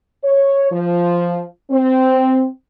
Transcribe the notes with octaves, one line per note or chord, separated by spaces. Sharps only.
C#5
F3
C4